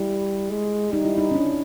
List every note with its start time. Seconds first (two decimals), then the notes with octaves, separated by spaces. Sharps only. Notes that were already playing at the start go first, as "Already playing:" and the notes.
Already playing: G3 E4
0.50 G#3
0.93 G3 D#4
1.05 E4
1.18 D#4
1.31 C#4
1.35 D4